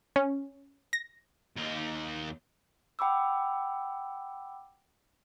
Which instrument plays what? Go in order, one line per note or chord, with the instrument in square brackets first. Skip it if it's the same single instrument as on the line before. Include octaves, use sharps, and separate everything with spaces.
[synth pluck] C#4
A#6
[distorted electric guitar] D#2 D#4
[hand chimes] F#5 G5 B5 D6 E6